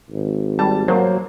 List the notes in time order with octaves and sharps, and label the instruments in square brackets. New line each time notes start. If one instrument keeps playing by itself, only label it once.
[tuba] G#1
[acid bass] G3 [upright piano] A5
[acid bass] F#3 [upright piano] A#3 C5